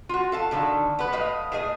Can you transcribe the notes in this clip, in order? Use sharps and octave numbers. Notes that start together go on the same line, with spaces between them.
F4 F#4
A4 F5 A5
B2 D3 D#3 A4
B3 B4
A2 B4 D#5 F5
A2 G#4 D#5